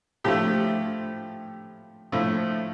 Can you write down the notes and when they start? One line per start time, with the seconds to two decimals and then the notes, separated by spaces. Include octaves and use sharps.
0.24 A2 F3 A3 G4
2.12 A2 F3 A3